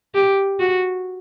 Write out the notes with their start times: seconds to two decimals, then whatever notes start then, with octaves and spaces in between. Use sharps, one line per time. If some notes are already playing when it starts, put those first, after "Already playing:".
0.15 G4
0.59 F#4